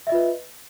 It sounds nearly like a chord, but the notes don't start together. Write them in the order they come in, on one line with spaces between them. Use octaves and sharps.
E5 D#5 F4 B4